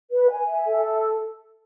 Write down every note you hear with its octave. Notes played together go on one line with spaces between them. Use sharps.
B4
G#5
E5
A4